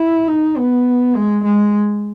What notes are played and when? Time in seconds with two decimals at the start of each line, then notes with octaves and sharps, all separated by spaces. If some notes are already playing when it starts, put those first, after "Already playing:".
Already playing: E4
0.28 D#4
0.57 B3
1.15 G#3
1.44 G#3